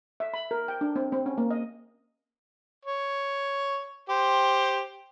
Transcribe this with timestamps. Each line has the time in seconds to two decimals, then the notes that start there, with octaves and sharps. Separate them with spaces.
0.20 E5
0.34 B5
0.51 A#4
0.68 G5
0.81 D4
0.96 C4
1.12 C4
1.26 C#4
1.38 A#3
1.51 D#5
2.85 C#5
4.09 G4 C5